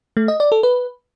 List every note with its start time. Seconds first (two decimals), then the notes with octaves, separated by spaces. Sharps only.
0.17 A3
0.28 D#5
0.40 D5
0.52 A4
0.63 B4